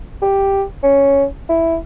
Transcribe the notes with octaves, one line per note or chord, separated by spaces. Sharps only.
G4
C#4
E4